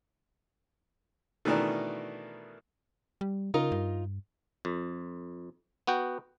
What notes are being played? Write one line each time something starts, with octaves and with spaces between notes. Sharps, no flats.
B2 D#3 E3 A3 D4 A#4
G3
C#3 D#4 F4 A#4
G2
F2
B3 F#4 G5